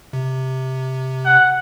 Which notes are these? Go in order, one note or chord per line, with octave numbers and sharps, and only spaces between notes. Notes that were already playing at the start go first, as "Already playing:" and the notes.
C3
F#5